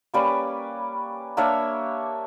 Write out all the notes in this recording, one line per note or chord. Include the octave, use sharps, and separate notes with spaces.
G3 A#3 C#4 B4 D5
A#3 D4 C#5 E5